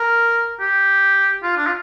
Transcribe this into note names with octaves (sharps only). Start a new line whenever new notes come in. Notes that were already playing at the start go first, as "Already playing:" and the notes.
Already playing: A#4
G4
F4
D4
F4